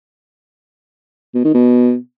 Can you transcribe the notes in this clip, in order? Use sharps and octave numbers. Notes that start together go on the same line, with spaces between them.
B2
D#3
B2